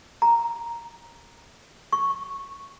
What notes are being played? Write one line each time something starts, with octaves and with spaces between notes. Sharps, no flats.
A#5
C#6